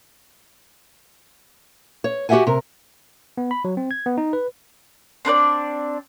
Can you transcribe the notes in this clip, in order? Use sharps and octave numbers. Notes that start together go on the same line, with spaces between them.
C#5
F#4 G4 D#5 E5 F#5 G#5
C3 A#4
B3
B5
F#3
C4
G#6
B3
D#4
B4
C4 D4 B4 D5